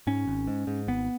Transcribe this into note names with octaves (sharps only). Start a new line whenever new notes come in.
G#2 C#4
G#1
G#2
G#2
G#1 B3